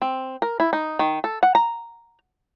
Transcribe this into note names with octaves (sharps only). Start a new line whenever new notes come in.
C4
A#4
E4
D#4
D#3
A4
F#5
A#5